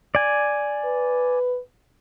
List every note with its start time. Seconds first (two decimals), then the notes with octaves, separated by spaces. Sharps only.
0.15 D5 G#5
0.85 B4